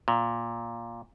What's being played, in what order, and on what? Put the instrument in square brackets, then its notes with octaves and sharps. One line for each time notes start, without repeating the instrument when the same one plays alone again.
[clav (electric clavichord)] A#2